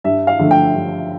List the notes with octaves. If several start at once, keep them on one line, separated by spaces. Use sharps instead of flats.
G2 E5
F5
D3 F3 A3
G5
G2